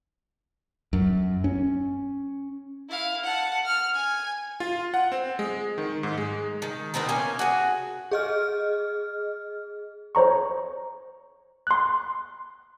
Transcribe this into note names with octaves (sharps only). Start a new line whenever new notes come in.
F#2
C#4
E4 F5
F#5 A5
F6
G#5
F4
F#5
C4
G#3
D#3
G#2
G#3
D#3
B2 C4 D#4 A#4
A#3 C#4 G#5
F#4 G#4
G#4 D#5 F6
C5 C#5 A#5 C#6
C6 F#6